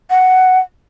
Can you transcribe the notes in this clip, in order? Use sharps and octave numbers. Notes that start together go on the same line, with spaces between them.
F#5